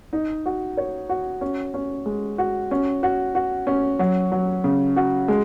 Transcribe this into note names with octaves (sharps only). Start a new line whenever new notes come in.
D#4
F#4
C#5
F#4
C#4
C#4
G#3
F#4
C#4
F#4
F#4
C#4
F#3
F#3
C#3
F#4
G#3